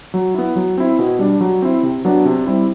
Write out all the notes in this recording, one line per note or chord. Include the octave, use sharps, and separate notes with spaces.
F#3
B3 E4
F#3
C4 E4
B2
G3 D4
F#3
C4 E4
C3
F#3 B3 D4
C3
G3 C4 E4